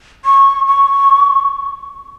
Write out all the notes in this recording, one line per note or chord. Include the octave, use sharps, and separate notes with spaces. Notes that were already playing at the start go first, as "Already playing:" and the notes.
C#6
C#6